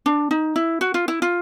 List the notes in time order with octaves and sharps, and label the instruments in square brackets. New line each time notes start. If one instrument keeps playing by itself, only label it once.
[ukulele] D4
D#4
E4
F#4
F4
E4
F4